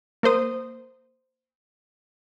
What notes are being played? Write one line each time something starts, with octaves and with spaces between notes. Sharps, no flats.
A#3 A#4 C5 D#6